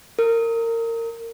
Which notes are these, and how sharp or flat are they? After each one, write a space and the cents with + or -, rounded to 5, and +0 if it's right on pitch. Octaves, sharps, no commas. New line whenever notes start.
A#4 -25